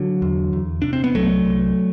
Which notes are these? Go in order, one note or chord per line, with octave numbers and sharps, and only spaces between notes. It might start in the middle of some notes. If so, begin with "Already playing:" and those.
Already playing: D3 F#3
E2
E2
C3 D4
C4
B3
C2 F#3 A3
C2